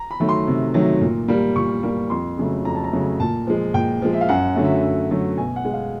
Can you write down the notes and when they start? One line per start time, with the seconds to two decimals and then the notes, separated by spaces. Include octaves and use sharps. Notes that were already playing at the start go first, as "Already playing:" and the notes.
Already playing: A#5
0.11 B5
0.20 D#3 F#3 A3
0.29 C6
0.47 C3
0.74 D#3 F#3 A3
1.01 A#2
1.28 G3 A#3
1.56 A#2 C#6
1.83 G3 A#3
2.10 F2 C6
2.38 C#3 F#3 A3
2.65 F2 A#5
2.75 A5
2.84 A#5
2.92 C#3 F#3 A3
3.20 A#2 A5
3.47 F3 G#3
3.74 A#2 G5
4.02 F3 G#3
4.13 E5
4.21 F5
4.29 F#2 F#5
4.56 D3 F#3 A3
4.64 E5
4.83 F#2
5.10 D3 F#3 A3
5.37 B2 G#5
5.56 F#5
5.65 G#3
5.73 F5